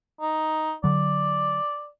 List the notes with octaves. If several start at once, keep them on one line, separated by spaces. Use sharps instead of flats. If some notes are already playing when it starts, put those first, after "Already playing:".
D#4
D3 F#3 D5